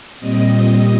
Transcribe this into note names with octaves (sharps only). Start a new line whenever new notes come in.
A#2 G3 C4 D#5
D#5